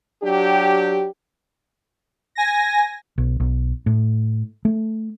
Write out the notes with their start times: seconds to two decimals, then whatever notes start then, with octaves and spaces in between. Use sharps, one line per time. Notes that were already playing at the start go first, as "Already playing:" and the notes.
0.22 F#3 D4 G4
2.35 G#5 A#6
3.18 B1
3.40 B1
3.86 A2
4.65 A3